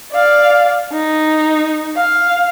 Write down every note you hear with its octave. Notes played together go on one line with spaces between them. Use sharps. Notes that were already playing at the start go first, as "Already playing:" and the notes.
D5 F5
D#4
F5